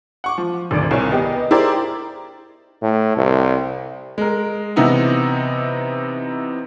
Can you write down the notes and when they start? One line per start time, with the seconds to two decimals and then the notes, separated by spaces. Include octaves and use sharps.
0.24 F#5 C#6 D6
0.38 F3
0.71 G#1 D2 D5 D6 D7
0.91 C2 A#4 C#5 G#5
1.12 B3 G4 D#5
1.51 E4 G4 G#4 A#4 C5 D5
2.82 A2
3.17 C2
4.18 G#3 A#4
4.76 C3 E3 B3 D#4 E4